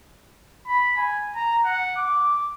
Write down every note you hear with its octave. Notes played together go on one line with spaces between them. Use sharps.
B5
G#5
A#5
F#5
D6